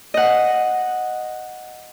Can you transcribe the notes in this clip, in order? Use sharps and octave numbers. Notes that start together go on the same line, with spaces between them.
D#5 F#5